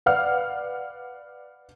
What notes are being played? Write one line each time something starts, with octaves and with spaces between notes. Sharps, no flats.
B4 D5 F5 F#5 F6